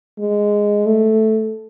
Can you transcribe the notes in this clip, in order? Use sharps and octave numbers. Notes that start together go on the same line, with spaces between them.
G#3
A3